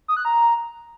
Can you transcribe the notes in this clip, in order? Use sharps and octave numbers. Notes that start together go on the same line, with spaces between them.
D#6
F#6
A#5